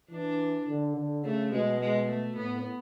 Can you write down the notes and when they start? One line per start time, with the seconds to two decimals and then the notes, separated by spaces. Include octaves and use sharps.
0.10 E3 D4
0.68 D3
0.96 D3
1.23 C#3 A3
1.52 B2 G#3
1.80 G#3
2.08 A3
2.37 A2 B3